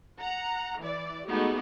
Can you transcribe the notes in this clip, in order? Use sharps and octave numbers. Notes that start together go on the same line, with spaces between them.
F#5 A#5
E3 D5
G#3 A3 B3 D#4 F#4 G4